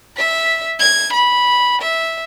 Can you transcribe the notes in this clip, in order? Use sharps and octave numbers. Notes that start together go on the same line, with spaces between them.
E5 B6
G#6
B5
E5